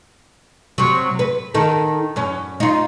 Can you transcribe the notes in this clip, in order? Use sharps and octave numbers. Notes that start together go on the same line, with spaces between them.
C3 F#3
B4
D#3 D#4 A4
F#2 C#4
D#4 F4